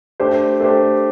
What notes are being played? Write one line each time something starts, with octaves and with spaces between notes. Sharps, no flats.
A3 D4 G4 C5
A3 D4 G4 C5